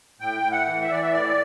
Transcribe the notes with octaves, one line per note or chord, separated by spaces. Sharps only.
A2 G5
A2
F#5
E3
E5
E3 D5
E5
A2 D5